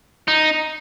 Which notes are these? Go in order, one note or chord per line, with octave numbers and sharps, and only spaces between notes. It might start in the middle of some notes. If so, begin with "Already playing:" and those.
D#4